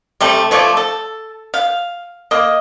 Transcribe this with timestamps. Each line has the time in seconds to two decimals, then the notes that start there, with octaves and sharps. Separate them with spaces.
0.21 C3 G3 A3
0.51 F3 A3 C#5 D5
0.77 A4
1.54 F5
2.31 A#3 D#5